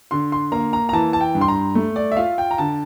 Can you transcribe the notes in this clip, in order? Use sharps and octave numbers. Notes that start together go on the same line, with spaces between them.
D3 C6
C6
A#3 A#5
A#5
A#5
E3 A5
A5
G5
G2
C6
A#5
A3
D5
E5
F4 F5
G5
A#5
D3 A5